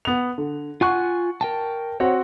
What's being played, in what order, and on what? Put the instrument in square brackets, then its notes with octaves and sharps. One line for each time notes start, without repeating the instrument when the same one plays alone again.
[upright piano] B3 F7
D3
[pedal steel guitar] F4 G#5 F#6 [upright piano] F#5 C#6
[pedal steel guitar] A#4 G5 A5
[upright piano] C4 F#4 F#5 [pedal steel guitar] C#5